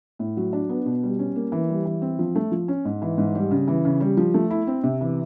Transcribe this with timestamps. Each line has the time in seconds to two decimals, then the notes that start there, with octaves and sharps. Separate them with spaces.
0.19 A2
0.37 F#3
0.53 D4
0.69 B3
0.86 B2
1.03 G3
1.19 C#4
1.36 A#3
1.52 E3
1.69 G3
1.85 E3
2.02 C4
2.19 F3
2.35 A3
2.52 F3
2.68 C#4
2.85 G#2
3.02 E3
3.18 G#2
3.35 G3
3.51 C#3
3.68 E3
3.85 C#3
4.00 G3
4.17 F3
4.34 A3
4.50 E4
4.67 C4
4.84 C3
5.01 E3